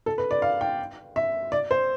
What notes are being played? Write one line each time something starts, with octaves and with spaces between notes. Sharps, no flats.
A4
B4
D5
F5
G5
E5
D5
C5